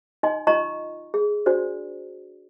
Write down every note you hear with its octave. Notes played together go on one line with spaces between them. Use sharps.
D#4 D#5 G#5 C6
D#4 F4 D#5 A#5 C#6
G#4
D4 F#4 C5 D5